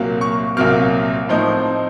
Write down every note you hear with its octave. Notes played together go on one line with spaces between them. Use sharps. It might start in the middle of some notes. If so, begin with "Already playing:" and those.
Already playing: C2 A#2 F#3 A#3
C#6
C2 A#2 F#3 A#3 F6
A2 F3 C4 D#4